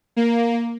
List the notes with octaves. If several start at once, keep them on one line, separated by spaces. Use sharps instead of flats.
A#3